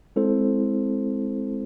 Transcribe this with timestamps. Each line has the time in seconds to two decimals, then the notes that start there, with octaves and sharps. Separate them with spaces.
0.16 G#3 C4 E4 A4 C5